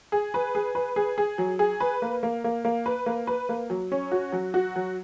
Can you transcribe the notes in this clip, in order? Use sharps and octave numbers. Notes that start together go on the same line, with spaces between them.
G#4
B4
G#4
B4
G#4
G#4
F#3
G#4
B4
A#3
A#3
A#3
A#3
B4
A#3
B4
A#3
F#3
C#4
F#4
F#3
F#4
F#3